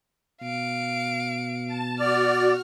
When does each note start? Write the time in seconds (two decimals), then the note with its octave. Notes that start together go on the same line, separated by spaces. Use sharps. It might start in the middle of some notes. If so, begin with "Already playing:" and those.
0.42 B2 F5 D7
1.67 A5
1.99 F#4 D5 F6